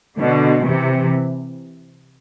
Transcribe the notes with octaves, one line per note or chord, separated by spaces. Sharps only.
B2 D3
C3 E3